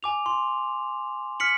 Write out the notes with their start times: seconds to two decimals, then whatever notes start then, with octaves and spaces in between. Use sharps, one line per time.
0.03 G#5 D6 F7
0.26 C6
1.40 F6 B6 C#7 F#7